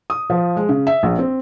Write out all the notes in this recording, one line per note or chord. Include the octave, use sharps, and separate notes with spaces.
D#6
F3
G#3
C#3
E5
A#1
C4